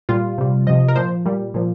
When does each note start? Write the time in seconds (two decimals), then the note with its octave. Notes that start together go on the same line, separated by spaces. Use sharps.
0.09 A#2 G3 F4
0.38 C3 G3
0.67 C3 F3 D#5
0.88 A#4
0.96 A#2 F3 C5
1.25 A#2 G3
1.54 A#2 F3